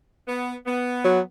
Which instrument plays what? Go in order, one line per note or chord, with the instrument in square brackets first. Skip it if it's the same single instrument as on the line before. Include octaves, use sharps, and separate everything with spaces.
[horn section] B3
B3
[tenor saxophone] F#3